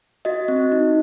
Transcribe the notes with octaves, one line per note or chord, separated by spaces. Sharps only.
F#4 D#5
C4
D#4